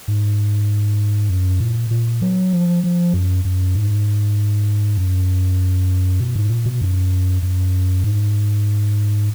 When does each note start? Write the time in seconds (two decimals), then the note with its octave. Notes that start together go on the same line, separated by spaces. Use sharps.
0.08 G#2
1.29 F#2
1.60 A#2
1.91 A#2
2.22 F#3
2.53 F3
2.84 F3
3.14 F#2
3.45 F#2
3.75 G#2
4.97 F#2
6.20 B2
6.36 G#2
6.50 A#2
6.66 B2
6.81 F#2
7.42 F#2
8.04 G#2